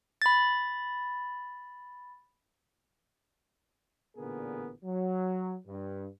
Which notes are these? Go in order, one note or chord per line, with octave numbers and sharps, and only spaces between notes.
B5 A6
A1 A#2 D3 B3 G#4 A#4
F#3
G2